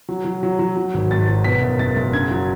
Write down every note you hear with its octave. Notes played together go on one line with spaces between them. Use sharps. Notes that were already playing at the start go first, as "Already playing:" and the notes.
F#3
F#3
F#3
F#3
F#3
G#1
G#1 A6
F#3
B2 B6
F#1
F#1 A6
F#1
C#3 G#6
F#3